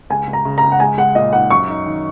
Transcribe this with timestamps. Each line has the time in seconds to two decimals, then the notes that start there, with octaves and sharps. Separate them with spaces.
0.10 C#2 G#5
0.27 C#2
0.33 A#5
0.45 C#3
0.58 A#5
0.63 C#2
0.72 F#5
0.80 G#3 G#5
0.98 G#3 F#5
1.15 A#2 D#5
1.33 D#4 F#5
1.50 F#2 C#6
1.68 D#4
1.86 D#3